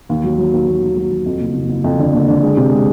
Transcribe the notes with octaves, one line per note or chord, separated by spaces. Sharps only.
D#2
F#3
F#3
D#2
D#2
D#2
F#3
F#3
F2
F#1
F#1
F#1
F2
D3
F#1
D3
G#3
C3
G#3